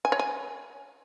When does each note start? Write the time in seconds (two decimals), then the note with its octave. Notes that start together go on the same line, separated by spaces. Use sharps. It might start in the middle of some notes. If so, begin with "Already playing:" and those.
0.05 G#5
0.12 C#5
0.19 G#5